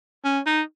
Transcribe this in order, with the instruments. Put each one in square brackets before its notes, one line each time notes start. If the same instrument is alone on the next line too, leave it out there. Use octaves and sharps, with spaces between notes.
[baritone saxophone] C#4
D#4